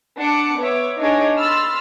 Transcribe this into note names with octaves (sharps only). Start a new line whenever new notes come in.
D4 F#5 A5 D6 C#7
B3 C#5 E5 D6
D4 D#4 G#4 C#5 D#5 D6
B5 C6 E6 F6 A6